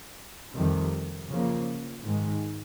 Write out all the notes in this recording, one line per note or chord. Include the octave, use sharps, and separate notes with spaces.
F2 C3 D#3 G3
C#3 F3 A#3
G#2 D#3 G#3